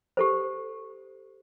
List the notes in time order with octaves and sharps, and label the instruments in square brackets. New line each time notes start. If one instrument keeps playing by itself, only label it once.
[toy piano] G4 A4 C5